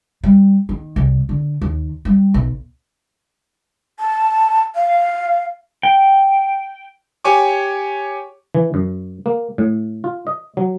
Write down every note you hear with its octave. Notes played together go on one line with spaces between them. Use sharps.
G3
D#3
C2
D3
D#2
G3
B1
A5
F5
G5
G4 C#5 G#5 C#6 D6
E3
F#2
A#3
A2
F4
D#5
F#3